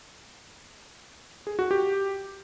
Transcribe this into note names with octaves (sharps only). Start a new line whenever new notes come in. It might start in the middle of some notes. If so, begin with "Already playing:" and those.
G#4
F#4
G4